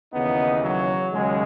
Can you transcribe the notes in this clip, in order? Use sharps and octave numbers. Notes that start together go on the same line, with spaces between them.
D#2 C#3 E3 B3 D#4
F#3
D#2 C#3 F#3 G#3